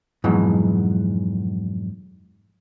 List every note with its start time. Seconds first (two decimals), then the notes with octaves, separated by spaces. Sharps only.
0.24 F2 G#2 B2 E3 F#3